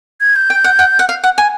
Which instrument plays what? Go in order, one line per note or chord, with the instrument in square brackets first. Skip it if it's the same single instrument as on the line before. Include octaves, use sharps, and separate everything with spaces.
[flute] G#6
G6
[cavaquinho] G5
F#5
F#5
F#5
F5
F#5
G#5